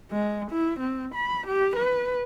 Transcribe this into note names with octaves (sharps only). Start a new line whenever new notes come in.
G#3
E4
C4
B5
G4
B4